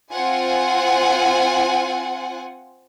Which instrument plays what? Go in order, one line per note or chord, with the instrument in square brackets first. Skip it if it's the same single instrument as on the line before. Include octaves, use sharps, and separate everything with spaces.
[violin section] C4 F4 C5 F#5 G#5